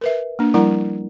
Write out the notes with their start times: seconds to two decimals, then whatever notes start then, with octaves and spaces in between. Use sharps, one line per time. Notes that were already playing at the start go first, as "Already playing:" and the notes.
0.01 A#4 B4 E5
0.39 A#3 D4
0.54 F3 G3 E4 A#4 F#5 A#5